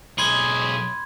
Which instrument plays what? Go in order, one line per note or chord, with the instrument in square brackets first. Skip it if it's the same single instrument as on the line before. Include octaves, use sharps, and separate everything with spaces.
[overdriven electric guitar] B1 G#4 [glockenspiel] B5 C6 G#6